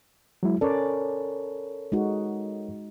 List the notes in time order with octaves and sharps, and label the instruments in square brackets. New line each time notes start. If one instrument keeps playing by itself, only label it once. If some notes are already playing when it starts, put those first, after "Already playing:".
[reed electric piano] F#3 G#3 E4
[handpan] C#4 D5 [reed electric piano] A4 A#4 C#5
[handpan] G#3 D#4 F#4